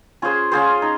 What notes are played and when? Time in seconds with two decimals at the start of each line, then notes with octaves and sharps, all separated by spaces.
0.22 C#4 F4 G#4 C5
0.52 C#4 F4 G#4 C5
0.82 D#4